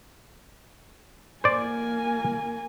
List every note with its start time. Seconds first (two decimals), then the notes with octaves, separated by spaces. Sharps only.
1.44 A#3 C5 D5 G#5